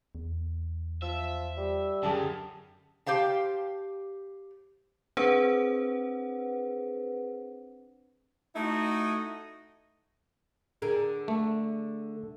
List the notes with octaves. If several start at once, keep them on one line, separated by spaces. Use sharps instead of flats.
E2
F3 E5
G3
F#2 D3 G4 G#4 A5
G4 C5 F5 A5
C4 D4 G#4 B4 C5 F#5
A3 D#4 E4 F#4 D#5
D3 G#4 A#4
A3